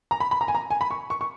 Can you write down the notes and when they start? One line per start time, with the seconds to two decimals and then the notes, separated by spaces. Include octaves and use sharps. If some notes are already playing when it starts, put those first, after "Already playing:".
0.11 A#5
0.20 B5
0.31 B5
0.41 A#5
0.48 G#5
0.55 A#5
0.71 G#5
0.81 B5
0.91 C#6
1.10 C#6
1.21 C#6